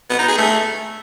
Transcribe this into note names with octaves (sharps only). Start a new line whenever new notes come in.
B3
D#4
G#4
A3